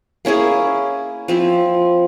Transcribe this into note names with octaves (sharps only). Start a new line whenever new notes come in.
A#3 C#4 E4 G#4
F3 C4 E4